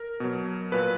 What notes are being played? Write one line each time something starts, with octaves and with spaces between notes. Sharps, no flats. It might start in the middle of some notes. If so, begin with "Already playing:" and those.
Already playing: A#4
B2 F#3
A#2 F#3 B4